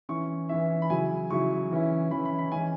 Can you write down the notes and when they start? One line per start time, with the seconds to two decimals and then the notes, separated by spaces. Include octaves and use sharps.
0.09 E3 C#4 E4 C#6
0.49 E3 C#4 E4 E5
0.82 B5
0.89 C#3 F#3 E4 G#5
1.30 C#3 F#3 E4 C#6
1.71 E3 C#4 E4
2.11 E3 C#4 E4 B5
2.25 B5
2.39 B5
2.52 E3 G#3 C#4 G#5